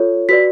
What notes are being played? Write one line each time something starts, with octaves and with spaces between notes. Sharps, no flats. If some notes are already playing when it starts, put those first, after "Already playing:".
Already playing: F4 A4 C#5
F#4 B4 D5 B6